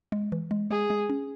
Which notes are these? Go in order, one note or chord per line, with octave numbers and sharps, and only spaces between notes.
G#3
E3
G#3
G#3 G#4
G#3
C#4